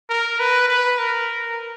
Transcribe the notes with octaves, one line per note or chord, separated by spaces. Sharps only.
A#4
B4
B4
A#4